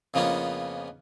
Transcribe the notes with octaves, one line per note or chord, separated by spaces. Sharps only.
F2 C#3 F3 A#3 B3 C#4